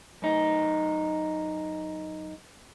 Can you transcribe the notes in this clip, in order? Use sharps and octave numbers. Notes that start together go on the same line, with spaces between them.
F#2 D#4